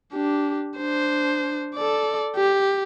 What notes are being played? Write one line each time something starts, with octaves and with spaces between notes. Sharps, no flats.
D4 G4
D4 C5
A4 D5
G4